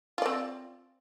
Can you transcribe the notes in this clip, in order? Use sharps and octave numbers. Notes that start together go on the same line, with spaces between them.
C4 F4 D5